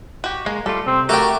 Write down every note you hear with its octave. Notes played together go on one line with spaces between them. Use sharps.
F#4 G4
G#3 A#3
G3 A3 F4 A4
C3 C4
A3 F#4 G4 A#4 E5 G5